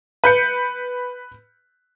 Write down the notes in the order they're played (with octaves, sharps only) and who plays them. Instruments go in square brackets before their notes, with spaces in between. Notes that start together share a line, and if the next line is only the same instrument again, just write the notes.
[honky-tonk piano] B4 G6 C#7